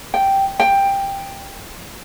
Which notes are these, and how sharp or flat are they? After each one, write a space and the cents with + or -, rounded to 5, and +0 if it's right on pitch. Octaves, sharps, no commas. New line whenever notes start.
G5 -5
G5 +10